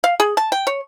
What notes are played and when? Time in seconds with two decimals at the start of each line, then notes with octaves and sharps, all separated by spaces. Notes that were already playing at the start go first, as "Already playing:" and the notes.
0.04 F5
0.20 G#4
0.37 A5
0.52 G5
0.67 C#5